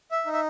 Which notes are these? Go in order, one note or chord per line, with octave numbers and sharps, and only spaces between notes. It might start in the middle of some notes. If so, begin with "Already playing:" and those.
E5
D#4
E5